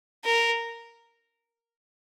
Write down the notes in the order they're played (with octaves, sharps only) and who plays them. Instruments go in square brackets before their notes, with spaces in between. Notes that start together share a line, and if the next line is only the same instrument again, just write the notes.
[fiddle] A#4